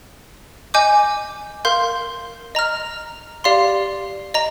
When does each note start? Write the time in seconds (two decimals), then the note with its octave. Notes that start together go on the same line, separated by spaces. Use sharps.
0.74 D#5 G#5 D6 G6
1.65 A#4 F5 C6 G6
2.55 D#5 A#5 F6
3.44 G4 D5 F5 C6
4.34 D#5 A#5